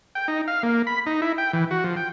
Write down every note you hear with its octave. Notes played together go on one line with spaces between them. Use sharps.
G5
D#4
F5
A#3
B5
D#4
E4
G5
E3
F#4
F3
G5